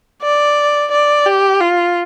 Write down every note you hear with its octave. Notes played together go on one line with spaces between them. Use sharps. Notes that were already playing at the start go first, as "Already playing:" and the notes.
D5
D5
G4
F4